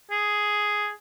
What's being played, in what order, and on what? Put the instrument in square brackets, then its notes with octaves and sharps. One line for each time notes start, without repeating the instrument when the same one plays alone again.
[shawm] G#4